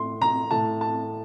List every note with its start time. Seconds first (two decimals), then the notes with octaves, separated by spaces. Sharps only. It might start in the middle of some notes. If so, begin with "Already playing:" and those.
Already playing: A2 C6
0.22 A#5
0.51 A2 A5
0.81 A5